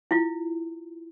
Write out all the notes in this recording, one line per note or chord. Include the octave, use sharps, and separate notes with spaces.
E4 F4